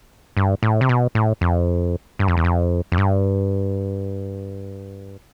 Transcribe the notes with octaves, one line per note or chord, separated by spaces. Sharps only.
G2
A2
C3
B2
A2
F2
G2
F2
E2
F2
F2
G2